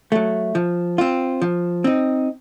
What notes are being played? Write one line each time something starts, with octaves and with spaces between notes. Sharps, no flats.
F#3 A3
F3
C4 F4
F3
C4 D#4